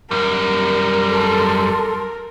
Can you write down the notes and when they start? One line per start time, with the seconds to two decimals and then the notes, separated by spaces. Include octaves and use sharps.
0.11 F#2 G3 A#4
1.08 A4 C6